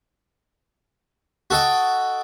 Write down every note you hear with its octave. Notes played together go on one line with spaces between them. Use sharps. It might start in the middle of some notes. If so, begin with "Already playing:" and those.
F#4 A4 D#5 G5